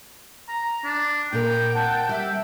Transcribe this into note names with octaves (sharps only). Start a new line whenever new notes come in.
A#5
D4
A#2 A#4 G5
C4 F#5 A5
G3 E5